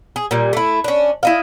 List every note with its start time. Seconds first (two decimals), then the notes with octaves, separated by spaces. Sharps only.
0.16 G#4
0.31 A#2 G3
0.53 A3 E4
0.84 C#4 D4
1.23 E4 D#5 F5